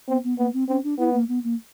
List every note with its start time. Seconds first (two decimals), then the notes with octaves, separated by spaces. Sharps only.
0.08 B3 C4
0.24 B3
0.38 A#3 B3
0.54 C4
0.68 C4 C#4
0.84 D4
0.98 B3 E4
1.13 A#3
1.29 B3
1.44 A#3